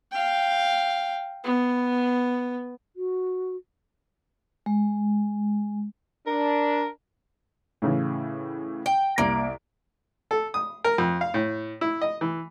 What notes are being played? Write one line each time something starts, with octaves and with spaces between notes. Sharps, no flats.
F5 G5
B3
F#4
G#3
D4 A#4
A2 C#3 E3
G5
C2 A#3 D7
A4
D#6
A#4
F2
F5
A2
E4
D#5
E3